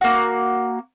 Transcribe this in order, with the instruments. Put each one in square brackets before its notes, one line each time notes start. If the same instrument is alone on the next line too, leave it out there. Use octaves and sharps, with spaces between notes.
[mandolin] A#3 F#4